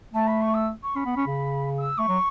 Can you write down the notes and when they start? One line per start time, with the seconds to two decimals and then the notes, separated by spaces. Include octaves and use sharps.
0.14 A3 A5
0.27 B5
0.41 C#6
0.54 E6
0.83 C#6
0.96 C#4 B5
1.06 B3
1.17 C#4
1.27 C#3
1.78 E6
1.98 A3 C#6
2.08 F#3